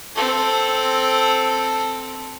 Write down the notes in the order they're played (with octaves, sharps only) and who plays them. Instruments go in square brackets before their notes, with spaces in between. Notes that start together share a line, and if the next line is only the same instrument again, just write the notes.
[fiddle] C4 A4